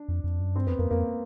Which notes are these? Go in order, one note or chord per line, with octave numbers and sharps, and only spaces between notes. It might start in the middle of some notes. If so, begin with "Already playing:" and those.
Already playing: D4
F2
F2
F#2
G2 C4
F2 B3
F2 A#3
F2 A#3